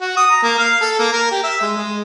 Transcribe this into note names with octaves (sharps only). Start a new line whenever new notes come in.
F#4
D#6
A#5
A#3
F5
A4
A#3
A#4
G4
E5
G#3
G#3